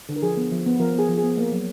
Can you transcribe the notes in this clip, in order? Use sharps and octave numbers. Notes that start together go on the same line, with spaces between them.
D3
A#4
F3 G#4
B3
F3
B3
F3 A#4
B3 G#4
F3
G#4
B3
A#3
F#3